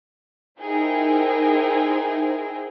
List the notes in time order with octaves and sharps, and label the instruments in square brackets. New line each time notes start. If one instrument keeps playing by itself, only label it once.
[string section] D#4 E4 G#4 A#4 C5 G5